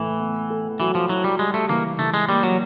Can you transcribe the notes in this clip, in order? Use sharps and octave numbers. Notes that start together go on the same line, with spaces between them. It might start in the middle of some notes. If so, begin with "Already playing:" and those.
Already playing: A2 E3 A3
B3
A4
E3 F#3
F3
F#3 E4
G3
G3 G#3
A3
E3 A#3
E3 A3
G#3
G3 A#3
F#3